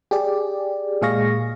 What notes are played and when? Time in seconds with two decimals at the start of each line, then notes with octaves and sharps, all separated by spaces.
0.11 G4 G#4 D5
1.02 A#2 G#3 G#4 F5 C#6 A#6